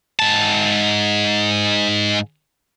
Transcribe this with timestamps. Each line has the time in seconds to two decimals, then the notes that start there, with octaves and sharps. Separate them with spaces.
0.19 G#2 A5